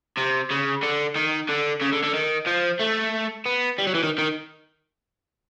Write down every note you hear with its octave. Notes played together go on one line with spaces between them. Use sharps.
C3
C#3
D3
D#3
D3
C#3
D3
D3
D#3
F3
A3
B3
G3
F#3
E3
D#3
D#3